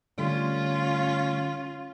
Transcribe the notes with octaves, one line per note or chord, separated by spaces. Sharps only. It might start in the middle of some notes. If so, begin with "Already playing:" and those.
D3 G3 A3 C#4 F4